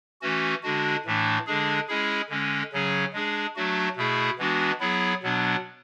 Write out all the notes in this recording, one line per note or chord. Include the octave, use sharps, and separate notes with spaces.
E3 A3 C#4 F#4
D3 G#3 D4 F#4
A2 E3 A3 D4
D3 G#3 D4 G#4
G#3 C#4 E4 G#4
D3 G#3 C#4
C#3 F#3 C#4 G#4
G#3 D4 G#4
F#3 A3 D4 F#4
B2 A3 E4 G#4
E3 G#3 B3 D4 F#4
F#3 B3 E4 G#4
B2 F#3 B3 D4